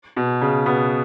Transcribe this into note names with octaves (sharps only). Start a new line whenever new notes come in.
B2
C#3
B2 B3